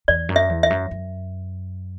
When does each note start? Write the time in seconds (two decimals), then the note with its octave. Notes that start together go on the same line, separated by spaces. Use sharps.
0.08 E2 D5
0.29 F#2
0.36 E5
0.49 E2
0.63 E5
0.70 F#2
0.91 F#2